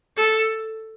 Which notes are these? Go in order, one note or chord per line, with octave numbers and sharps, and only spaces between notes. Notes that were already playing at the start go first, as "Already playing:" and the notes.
A4